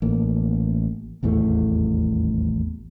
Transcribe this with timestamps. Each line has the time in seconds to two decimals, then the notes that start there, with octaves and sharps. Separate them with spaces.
0.02 A1 A#3
1.23 D#1 A1 E2 A3